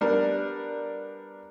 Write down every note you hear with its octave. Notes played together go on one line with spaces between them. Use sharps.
G3 B3 D4 A#4